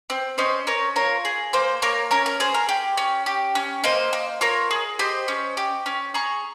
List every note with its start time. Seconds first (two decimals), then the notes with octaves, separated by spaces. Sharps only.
0.10 C4
0.38 C#4 C5 D#5
0.67 C#4 A#4 C#5
0.96 F4 A#4 C#5
1.25 G#4
1.53 A#3 C5
1.82 A#3 A#4 C#5
2.11 C#4 A#4 C#5
2.26 A#4
2.40 G#4 C5
2.54 A#4
2.69 G4
2.97 C#4
3.26 G4
3.55 C#4
3.84 A#3 C5 D#5
4.13 A#3
4.41 F4 A#4 C#5
4.71 G#4
4.99 G4 C5 D#5
5.28 C#4
5.57 G4
5.86 C#4
6.14 G#4 A#5 C#6